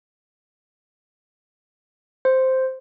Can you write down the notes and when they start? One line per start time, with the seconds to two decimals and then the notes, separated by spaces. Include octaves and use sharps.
2.25 C5